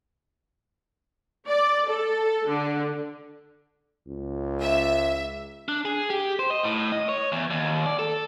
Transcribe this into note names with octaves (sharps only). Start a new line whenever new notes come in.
D5
A4
D3
C#2
E5
D4
G#4
G4
C5
D#5
A2
D#5
C#5
E2
D#2
D5
A4